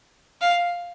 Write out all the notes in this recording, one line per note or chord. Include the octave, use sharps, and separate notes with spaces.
F5